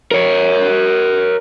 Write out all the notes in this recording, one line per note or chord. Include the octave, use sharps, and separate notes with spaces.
A#4 C#5